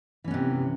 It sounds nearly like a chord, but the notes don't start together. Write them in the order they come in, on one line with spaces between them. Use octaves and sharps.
E3 C#4 B3 C3